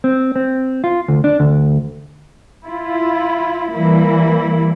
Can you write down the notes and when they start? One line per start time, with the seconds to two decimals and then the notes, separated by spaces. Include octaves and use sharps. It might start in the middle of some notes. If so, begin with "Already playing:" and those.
0.04 C4
0.36 C4
0.84 F4
1.08 D2
1.24 D4
1.40 D2
2.64 E4 F4
3.75 E3 G3 A#3 E4